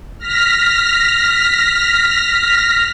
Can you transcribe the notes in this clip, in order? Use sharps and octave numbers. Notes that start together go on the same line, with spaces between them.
F6 A#6 B6